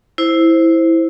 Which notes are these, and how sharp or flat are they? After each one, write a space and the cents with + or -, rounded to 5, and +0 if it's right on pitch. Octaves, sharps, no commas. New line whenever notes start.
E4 -5 C5 +0